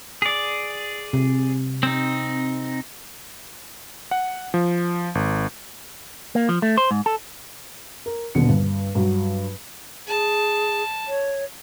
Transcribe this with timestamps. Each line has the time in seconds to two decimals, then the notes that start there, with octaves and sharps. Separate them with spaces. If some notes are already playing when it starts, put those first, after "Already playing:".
0.22 G#4 D5
1.13 C3
1.83 C4 D#4
4.11 F#5
4.54 F3
5.15 G#1
6.35 A#3
6.49 F3
6.62 A3
6.77 C5
6.91 G#2
7.06 A4
8.06 A#4
8.35 D#1 B2 D3 C#7
8.48 G2
8.95 G2 F#3
10.07 G#4 A5
11.08 C#5